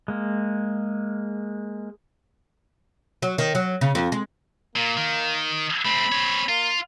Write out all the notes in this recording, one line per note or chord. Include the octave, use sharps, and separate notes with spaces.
G#3 A#3
F#3
D#3
F#3
C#3
F2
G#3
A#2 A#3
D#3
A3 C4 B5
C4 C#5
A#3 F4